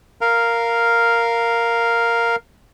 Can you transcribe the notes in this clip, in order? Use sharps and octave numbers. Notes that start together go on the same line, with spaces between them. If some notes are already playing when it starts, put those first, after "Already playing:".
A#4 F5